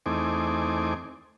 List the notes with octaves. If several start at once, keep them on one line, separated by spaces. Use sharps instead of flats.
E2 A3 C4 D#4 G#5 D6